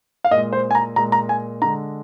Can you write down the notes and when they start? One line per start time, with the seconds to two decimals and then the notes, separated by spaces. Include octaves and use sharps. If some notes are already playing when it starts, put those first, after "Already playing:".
0.24 F5
0.31 A#2 D#5
0.35 G#3
0.52 C5
0.71 G#5
0.75 A#5
0.96 A#2 G#3 A#5
1.12 A#5
1.29 G#5
1.62 D3 G#3 A#5